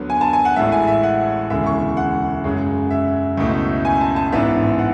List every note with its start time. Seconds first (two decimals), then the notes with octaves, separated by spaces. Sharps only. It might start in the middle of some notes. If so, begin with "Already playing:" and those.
Already playing: D2 D3 F#3 B3
0.10 G#5
0.21 A5
0.33 G#5
0.45 F#5
0.56 A1 A2 G#3 E5
0.72 G#5
0.87 E5
1.03 F#5
1.50 E1 D2 C#3 E3 G#3 E5
1.66 C#6
1.97 F#5
2.44 F#2 C#3 G#3
2.91 E5
3.38 C#2 B2 A3 E4
3.85 G#5
4.01 A5
4.16 A5
4.32 A1 G#2 E3 B3 D4 E5
4.79 F#5